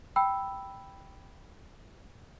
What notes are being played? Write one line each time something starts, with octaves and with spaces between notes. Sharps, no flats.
G5 B5 E6